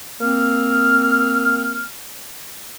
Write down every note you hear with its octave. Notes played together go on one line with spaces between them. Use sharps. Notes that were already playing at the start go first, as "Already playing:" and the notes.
A#3 C4 F6